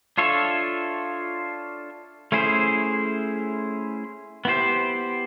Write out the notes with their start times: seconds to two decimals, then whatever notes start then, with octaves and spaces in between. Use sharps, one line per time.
0.18 D4 F4 A4 C#5 E5
2.32 A3 C#4 E4 G#4 C5
4.45 B3 E4 G4 C5